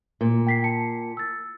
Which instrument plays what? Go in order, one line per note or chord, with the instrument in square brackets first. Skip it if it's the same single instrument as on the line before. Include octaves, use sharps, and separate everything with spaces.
[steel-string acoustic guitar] A#2
[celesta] G5 B6 C7
A5 C#7
E6 A6